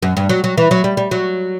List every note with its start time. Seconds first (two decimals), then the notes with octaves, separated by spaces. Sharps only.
0.03 F#2
0.17 G2
0.29 F#3
0.44 F#3
0.58 E3
0.71 F#3
0.84 G3
0.97 G3
1.11 F#3